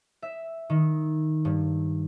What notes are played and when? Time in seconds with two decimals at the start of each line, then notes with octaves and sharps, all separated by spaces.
0.22 E5
0.70 D#3
1.45 G2